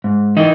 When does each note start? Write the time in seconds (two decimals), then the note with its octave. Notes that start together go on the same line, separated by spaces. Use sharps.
0.04 G#2
0.37 E3 D#4